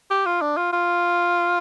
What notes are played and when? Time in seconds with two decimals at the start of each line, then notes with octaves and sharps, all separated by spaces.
0.10 G4
0.26 F4
0.41 D4
0.57 F4
0.73 F4